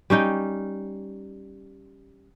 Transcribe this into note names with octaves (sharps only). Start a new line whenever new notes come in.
G3 C#4 D#4 G5